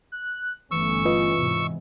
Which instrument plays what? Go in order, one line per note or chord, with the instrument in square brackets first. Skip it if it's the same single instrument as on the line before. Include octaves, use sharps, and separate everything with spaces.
[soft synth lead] F#6
[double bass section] G1 A3 C#4 [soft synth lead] E3 [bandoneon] C#6 E6
[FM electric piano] F4 B4 D#5
[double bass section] E2 G#2 C3